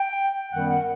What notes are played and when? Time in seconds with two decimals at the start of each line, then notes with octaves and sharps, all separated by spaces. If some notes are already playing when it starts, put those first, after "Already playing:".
Already playing: G5
0.53 F#2 D#3 G3 B3 F#5
0.69 F#5